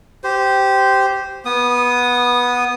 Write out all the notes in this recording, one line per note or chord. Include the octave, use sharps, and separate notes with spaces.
G4 C5
B3 D#6